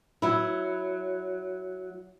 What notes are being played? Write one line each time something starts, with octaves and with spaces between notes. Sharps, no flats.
F#3 E4